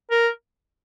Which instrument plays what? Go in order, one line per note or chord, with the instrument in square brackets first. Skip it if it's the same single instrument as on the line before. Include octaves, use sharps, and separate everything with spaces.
[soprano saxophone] A#4